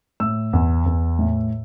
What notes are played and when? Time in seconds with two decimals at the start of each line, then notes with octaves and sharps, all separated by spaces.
0.20 A2 E6
0.53 E2
0.86 E2
1.19 A2